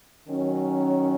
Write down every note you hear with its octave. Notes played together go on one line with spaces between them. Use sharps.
D#3 F#3 C#4